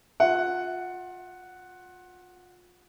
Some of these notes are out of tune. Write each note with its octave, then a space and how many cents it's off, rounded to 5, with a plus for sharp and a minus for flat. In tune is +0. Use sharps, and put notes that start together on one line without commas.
F4 +30 F#5 +0